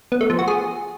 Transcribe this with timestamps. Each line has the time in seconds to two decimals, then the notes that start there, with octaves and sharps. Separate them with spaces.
0.12 B3
0.21 A3
0.30 F3
0.39 F#4
0.48 G#4